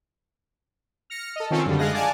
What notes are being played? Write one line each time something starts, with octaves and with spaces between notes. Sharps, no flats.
F6 A#6 C#7
A4 D#5
D#3 C4 C#4 F4 A4
F#2 D3 G3
G#3 F4 G#4 D#5 F#6 A#6
D5 F5 F#5 G#5 A5 D6